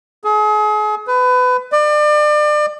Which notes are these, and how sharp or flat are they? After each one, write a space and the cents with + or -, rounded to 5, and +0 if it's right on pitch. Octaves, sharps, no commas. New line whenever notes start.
G#4 +35
B4 +25
D5 +35